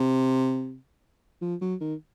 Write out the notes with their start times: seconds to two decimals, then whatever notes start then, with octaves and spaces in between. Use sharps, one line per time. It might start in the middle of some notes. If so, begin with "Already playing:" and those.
Already playing: C3
1.41 F3
1.61 F#3
1.80 D#3